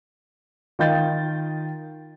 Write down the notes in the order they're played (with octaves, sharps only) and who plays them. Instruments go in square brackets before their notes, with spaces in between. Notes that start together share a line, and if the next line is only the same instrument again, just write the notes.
[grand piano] D#3 F4 D#5 G5 G6 A6